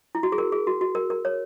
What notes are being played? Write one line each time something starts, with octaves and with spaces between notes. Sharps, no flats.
E4
F#4
G#4
A#4
G#4
F#4
F#4
A#4
A#4
C#5